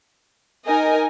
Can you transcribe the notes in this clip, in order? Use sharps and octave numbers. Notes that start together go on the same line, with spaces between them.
D#4 A#4 D#5 G#5